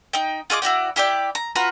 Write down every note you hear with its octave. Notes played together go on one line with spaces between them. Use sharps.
D#4 G5
F4 G#4 D#5 D6
E4 F#4 D5 G5
E4 G4 D5 G5
A#5
F4 F#4 B4 A#5